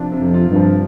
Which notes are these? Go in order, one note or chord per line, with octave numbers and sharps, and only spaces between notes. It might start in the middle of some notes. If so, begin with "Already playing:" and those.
Already playing: C3 F3 D4 F4
C3
F2
F4
G2
F3